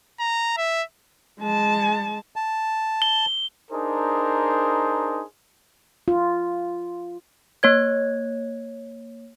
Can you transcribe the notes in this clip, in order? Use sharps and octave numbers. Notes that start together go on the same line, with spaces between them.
A#5
E5
G#3 A5
A5
G7
D4 D#4 G#4 A#4 C5
F4
A#3 C#5 G#6